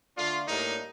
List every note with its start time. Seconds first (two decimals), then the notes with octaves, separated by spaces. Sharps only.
0.16 D3 A3 D4 F4
0.48 A2 G3 A#3 D4 D#4